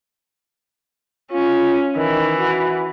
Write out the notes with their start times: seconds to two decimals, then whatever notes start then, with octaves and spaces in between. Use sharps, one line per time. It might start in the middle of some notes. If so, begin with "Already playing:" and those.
1.32 C#4 F4
1.96 D#3 E3
2.39 F#4